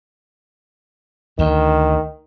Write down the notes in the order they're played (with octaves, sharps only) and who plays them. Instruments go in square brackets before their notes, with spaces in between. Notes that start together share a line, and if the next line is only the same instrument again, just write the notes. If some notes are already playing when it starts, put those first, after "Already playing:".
[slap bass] D2 [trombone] D#3